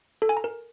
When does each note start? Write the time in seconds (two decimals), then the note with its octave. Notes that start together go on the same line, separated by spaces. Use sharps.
0.22 A4
0.29 G#5
0.37 A#5
0.44 A#4